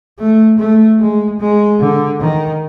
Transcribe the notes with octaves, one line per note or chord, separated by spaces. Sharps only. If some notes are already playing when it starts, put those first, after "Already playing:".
A3
A3
G#3
G#3
D3
D#3